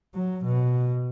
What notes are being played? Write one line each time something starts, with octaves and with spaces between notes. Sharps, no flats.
F#3
B2